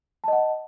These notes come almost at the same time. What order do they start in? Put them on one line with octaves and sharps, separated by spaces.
A5 D#5 F#5